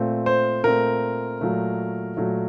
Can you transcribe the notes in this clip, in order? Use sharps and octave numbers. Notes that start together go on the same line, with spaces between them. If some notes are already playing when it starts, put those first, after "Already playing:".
Already playing: A#2 A3 C4
C5
A#2 A3 C4 A#4
A#2 F#3 A3
A#2 F#3 A3